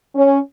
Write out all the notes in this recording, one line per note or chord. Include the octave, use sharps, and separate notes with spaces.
C#4